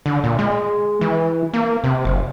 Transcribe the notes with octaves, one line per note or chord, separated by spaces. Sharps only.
D3
A#2
G#3
E3
A#3
C3
F#1